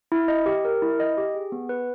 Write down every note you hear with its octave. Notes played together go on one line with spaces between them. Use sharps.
E4
D#5
G4
A#4
E4
D#5
G4
G#4
B3
B4